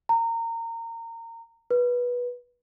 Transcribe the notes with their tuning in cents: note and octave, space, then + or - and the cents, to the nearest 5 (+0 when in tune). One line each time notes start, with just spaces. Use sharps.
A#5 -25
B4 -15